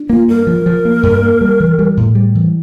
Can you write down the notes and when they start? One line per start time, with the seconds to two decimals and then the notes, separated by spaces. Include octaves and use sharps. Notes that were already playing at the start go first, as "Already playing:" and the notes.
Already playing: D4
0.10 A#3 F4
0.28 G2 A#4
0.47 F3
0.66 F3
0.85 A#3
1.03 G2
1.22 A#3
1.41 G3
1.60 E3
1.79 G3
1.97 A2
2.15 G3
2.35 E3